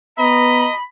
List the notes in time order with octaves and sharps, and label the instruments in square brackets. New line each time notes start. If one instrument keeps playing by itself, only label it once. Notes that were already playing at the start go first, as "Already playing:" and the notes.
[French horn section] B3 [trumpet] D#5 [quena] A#5 [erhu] B5